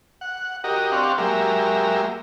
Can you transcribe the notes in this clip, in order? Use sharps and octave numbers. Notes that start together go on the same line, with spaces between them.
F#5
F#4 G4 A#4 D#5
C4 D4 G4 F5 F#5 C#6
F#3 G#3 A#3 G4 A#4 E5